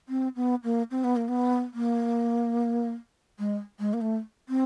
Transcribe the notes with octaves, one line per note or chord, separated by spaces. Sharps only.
C4
B3
A#3
C4
B3
A#3
B3
A#3
G#3
G#3
A#3
A3
C4